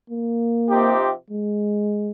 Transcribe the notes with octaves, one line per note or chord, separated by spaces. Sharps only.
A#3
C3 F3 C4 D#4 G4
G#3